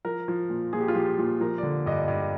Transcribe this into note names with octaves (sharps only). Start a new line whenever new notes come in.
F3 A#4
F3
A#2
A#2 G#4
G4
F4
F3 G4
A#2
F3 A#4
D3 D5
G2 D#5
D5
G2 D5